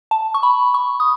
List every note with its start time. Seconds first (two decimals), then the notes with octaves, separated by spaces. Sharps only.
0.11 A5
0.34 C#6
0.43 B5
0.74 C#6
1.00 D#6